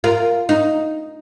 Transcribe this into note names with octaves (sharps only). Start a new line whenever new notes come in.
F4 A#4
D#4